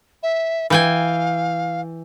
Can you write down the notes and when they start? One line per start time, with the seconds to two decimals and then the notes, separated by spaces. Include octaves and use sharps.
0.23 E5
0.70 E3 F5 G5 G#5